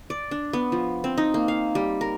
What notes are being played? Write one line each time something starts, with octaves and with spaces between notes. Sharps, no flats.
D5
D4
B3
F3
C4
D#4
A#3
F5
G3
A#4